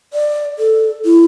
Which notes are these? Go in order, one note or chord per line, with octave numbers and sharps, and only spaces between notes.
D5
A4
E4